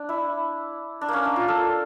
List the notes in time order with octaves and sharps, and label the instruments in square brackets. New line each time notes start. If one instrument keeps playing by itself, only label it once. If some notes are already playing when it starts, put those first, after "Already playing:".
Already playing: [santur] D4
E4
D4
A#3 C#4
D4
F4
A4